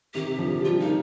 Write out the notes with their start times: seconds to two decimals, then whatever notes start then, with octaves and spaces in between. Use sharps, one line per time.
0.14 C3 D#3 G4
0.39 D3 F3
0.64 D#3 G3 F4
0.80 A#3 D#4